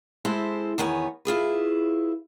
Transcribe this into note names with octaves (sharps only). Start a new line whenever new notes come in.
G#3 C4 E4 A4 C5
E2 D#3 B3 C#5 G#5
E4 F4 G#4 B4